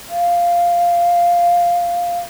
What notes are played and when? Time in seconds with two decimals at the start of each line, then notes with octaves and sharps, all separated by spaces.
0.09 F5